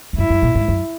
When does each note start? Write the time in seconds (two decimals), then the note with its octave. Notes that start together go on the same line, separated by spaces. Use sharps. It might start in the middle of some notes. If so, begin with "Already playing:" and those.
0.13 E2
0.18 F#2 E4
0.30 F#2
0.42 A#2
0.55 G#2
0.68 F#2